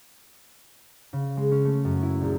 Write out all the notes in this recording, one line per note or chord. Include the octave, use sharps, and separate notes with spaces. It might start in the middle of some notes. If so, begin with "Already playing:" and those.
C#3
G#3
C#4
A3
F#2
E4
A#1